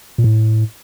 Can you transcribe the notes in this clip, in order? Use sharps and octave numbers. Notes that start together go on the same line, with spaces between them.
A#2
A2